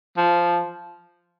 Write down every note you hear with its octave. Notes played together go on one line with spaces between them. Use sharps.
F3